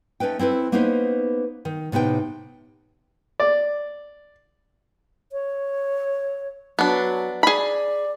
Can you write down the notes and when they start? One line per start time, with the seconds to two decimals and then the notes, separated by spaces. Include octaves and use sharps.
0.20 A3 C#4 D#4 B4 G5
0.39 C4 E4 A4 B4
0.72 A#3 B3 C#4 D#4 B4 C5
1.65 D#3
1.92 A2 C3 B3 D#4 G5
3.40 D5
5.32 C#5
6.79 F#3 B3 D4
7.43 G#4 D5 B5